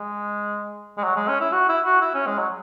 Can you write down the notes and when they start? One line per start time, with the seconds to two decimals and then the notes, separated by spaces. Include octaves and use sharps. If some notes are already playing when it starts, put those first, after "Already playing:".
Already playing: G#3
0.98 G#3
1.04 F#3
1.16 G#3
1.28 C#4
1.41 E4
1.52 F#4
1.69 E4
1.85 F#4
2.02 E4
2.15 C#4
2.26 G#3
2.38 F#3